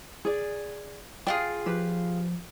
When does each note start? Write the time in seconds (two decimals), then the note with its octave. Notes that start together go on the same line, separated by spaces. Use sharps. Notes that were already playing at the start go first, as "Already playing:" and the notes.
0.25 G#4 D5
1.27 D4 F4 G#4 G5
1.66 F3 G4 B4